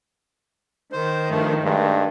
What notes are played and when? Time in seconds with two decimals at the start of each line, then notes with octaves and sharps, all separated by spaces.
0.92 D#3 C5
1.29 G2 F3 A3
1.64 G2 G#3 A3